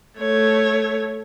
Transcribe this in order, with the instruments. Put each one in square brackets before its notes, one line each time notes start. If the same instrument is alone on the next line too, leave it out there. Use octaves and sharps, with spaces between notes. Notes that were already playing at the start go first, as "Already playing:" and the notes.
[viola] A3 C#5